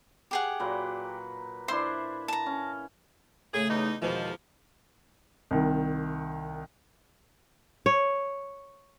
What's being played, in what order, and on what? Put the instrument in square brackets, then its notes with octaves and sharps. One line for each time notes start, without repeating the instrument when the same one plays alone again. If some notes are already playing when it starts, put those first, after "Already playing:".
[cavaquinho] G4 G#4 F#5
[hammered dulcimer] A#2 F#3 B4
[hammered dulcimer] D4 E4 E5 [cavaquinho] C5 C6
[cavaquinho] A5 A#5
[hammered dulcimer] C#4
[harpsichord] A2 C#3 A3 [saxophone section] G#4
[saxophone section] E2 D#4
[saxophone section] E2 F3 [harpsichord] G#2 B2 D#3
[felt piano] C2 D#3
[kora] C#5